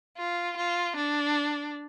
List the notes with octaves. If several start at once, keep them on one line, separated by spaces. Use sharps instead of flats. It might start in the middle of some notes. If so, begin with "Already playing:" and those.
F4
F4
D4